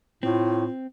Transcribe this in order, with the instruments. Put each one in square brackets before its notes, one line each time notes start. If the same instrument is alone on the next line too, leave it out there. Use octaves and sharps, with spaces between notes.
[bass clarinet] A2 [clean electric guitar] C4 [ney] F4